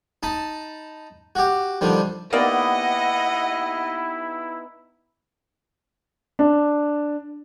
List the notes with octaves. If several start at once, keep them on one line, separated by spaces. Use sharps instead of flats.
D#4 A5 B5
F#4 G4
D3 D#3 F3 G3
A#3 B3 D#4 E4 G4 D5 D#5 F#5
D4